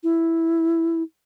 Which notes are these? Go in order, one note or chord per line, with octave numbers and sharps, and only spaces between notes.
E4